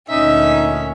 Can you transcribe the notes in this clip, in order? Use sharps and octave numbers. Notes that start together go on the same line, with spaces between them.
D2 A#2 C#4 D#4 E5